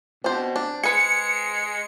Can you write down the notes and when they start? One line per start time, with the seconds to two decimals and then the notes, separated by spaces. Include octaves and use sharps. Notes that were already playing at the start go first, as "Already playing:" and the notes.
0.24 B2 C4 D4 C5
0.56 D4
0.83 G#3 G#4 B4 C#7